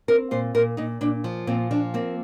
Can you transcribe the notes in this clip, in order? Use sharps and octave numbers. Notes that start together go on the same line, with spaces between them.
C4 A#4
A#2 C5
A#2 A#4
A#2 D#4
A#2 D4
F3
A#2 C4
F3 D4
A#3 C4